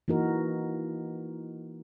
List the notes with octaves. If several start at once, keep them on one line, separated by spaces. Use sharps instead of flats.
E3 A#3 D#4 F#4 A#4